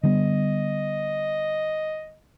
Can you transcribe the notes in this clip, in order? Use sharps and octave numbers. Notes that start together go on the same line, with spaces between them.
D3 G3 B3 D#5